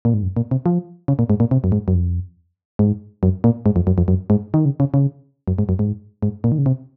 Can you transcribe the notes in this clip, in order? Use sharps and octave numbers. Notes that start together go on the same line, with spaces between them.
A#2
G#2
F#2
A#2
C3
F3
C#3
A#2
G#2
A#2
C3
F#2
G#2
F#2
F2
G#2
F#2
A#2
G#2
F2
F#2
F2
F#2
G#2
D#3
C#3
C#3
C#3
F#2
G#2
F#2
G#2
G#2
A#2
D#3
C#3
C3